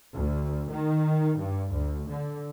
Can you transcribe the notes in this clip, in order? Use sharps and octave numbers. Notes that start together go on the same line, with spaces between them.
D2
D#3
G2
D2
D3